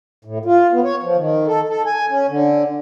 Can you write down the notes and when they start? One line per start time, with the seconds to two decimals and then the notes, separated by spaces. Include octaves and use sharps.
0.25 A2
0.45 F4
0.72 B3
0.84 C#5
1.03 F3
1.17 D#3
1.47 A4
1.69 A4
1.86 G#5
2.10 C#4
2.28 D3